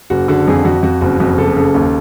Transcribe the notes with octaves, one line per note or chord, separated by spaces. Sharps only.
F#1 F#4
D3 F#4
F2 G#4
F2 F#4
F2 F#4
F#1 F#4
F2 F#4
F#1 A4
C#3 A4
D#2